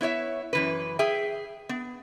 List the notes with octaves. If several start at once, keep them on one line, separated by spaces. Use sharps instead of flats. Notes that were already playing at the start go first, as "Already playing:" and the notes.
B3 E4 C#5 E5
F#2 E3 B4
G#4 E5 G5
B3